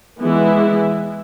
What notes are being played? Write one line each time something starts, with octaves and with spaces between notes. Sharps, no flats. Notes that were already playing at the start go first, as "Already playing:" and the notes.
E3 G#3 B3 E4